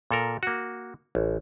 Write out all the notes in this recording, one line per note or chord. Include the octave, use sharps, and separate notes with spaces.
A#2 A4 A#4
A#3 F#4
A1